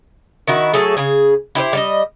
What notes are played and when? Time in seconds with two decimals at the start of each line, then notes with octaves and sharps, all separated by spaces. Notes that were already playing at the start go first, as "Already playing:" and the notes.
0.47 D#3 E4 F#4
0.73 F#3 A3 G#4 A4
0.97 C#3 G#4
1.55 E4 G4 B4 C5
1.73 G3 D5 D#5